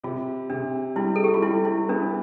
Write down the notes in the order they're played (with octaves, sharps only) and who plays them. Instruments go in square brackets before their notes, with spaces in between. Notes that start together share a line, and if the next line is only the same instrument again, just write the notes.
[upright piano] C3 [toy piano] F4
[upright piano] C3 [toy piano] D4
[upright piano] G3 [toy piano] E4
[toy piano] A4
G4
F4
[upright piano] G3 [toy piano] E4
[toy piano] E4
[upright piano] B3 [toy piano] D4